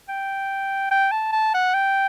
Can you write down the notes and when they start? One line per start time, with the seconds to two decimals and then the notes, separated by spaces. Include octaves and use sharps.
0.09 G5
0.91 G5
1.11 A5
1.32 A5
1.54 F#5
1.74 G5